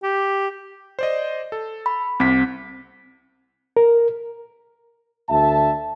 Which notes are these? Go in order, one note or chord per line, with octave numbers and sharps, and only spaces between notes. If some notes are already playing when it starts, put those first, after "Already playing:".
G4
C5 D5 D#5
A4
B5
C2 C4 B6
A#4
D2 E5 A5